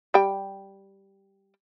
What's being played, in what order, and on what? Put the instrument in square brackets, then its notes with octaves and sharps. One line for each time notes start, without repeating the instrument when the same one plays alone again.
[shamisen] G3 G5